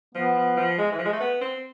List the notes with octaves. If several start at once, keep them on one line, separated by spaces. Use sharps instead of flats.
F3 B3
F3
F3
G#3
E3
F3
G#3
A3
B3
C4